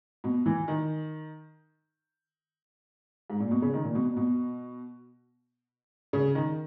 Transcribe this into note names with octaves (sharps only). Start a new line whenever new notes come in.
B2
E3
D#3
G#2
A#2
B2
C#3
D#3
A#2
B2
B2
B2
C#3
D#3